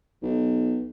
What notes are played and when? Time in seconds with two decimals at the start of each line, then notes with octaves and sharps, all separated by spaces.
0.23 B1